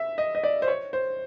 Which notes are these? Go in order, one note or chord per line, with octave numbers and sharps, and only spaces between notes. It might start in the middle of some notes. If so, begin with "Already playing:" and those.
Already playing: E5
D#5
D#5
D5
C5
C#5
C5